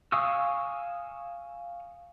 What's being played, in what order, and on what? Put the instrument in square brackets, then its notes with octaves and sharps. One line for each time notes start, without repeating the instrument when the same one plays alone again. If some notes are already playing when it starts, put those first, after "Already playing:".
[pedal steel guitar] F5 G#5 C#6 D#6 E6